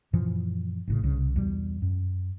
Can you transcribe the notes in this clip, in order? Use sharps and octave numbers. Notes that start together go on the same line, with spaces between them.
F#2 A#2 E3 F3
A1 A2 C#3
C2 C#3
E2 B2 G3
F#2